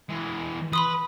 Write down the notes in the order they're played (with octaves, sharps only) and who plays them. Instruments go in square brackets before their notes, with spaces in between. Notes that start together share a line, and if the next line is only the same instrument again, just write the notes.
[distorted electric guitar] E3 G#3
[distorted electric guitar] B4 [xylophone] B5 C6 D#6